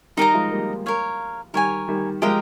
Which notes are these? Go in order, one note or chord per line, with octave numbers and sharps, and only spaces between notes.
D#3 G3 D#4 A#4 D#5 A#5
F3 G#3
G3 A#3
A#4 C#5 F5
D#3 G3 A#4 C#5 G#5
D#3 G3
F3 G#3 G4 A#4 D#5 G5